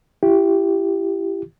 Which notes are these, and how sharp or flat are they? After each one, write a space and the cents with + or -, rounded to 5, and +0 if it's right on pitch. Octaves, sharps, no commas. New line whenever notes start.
E4 +35 G4 +0